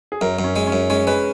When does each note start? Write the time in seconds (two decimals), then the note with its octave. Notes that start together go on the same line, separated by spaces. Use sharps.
0.12 G#4
0.21 F#2 A#4
0.39 F#2
0.44 C#4
0.56 G#3
0.67 C#4
0.72 F#2
0.90 G#3 C#4
1.07 G#3 B4